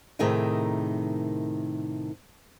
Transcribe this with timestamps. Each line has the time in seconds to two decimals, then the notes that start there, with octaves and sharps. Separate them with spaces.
0.19 A2 C3 D#3 G#4 A#4 D#5